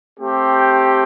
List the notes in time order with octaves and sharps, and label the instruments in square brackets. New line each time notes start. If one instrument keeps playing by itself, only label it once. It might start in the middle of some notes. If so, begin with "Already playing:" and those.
[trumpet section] A3 C4 G4